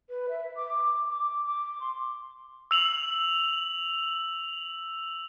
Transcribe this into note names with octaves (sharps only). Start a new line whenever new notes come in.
B4
E5
D6
D6
D6
C6
E6 F7 F#7